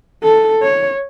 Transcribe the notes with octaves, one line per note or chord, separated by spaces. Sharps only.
A4
C#5